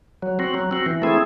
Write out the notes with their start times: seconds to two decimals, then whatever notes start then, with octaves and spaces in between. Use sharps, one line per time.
0.22 F#3
0.39 C4 F#4
0.54 F#3
0.71 C4 F#4
0.86 E3
1.02 A3 C4 E4 G#4